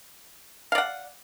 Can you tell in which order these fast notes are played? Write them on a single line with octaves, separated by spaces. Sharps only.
F5 D5 F#5